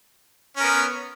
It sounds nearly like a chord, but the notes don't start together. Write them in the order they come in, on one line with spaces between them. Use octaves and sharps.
C#4 A#4 B3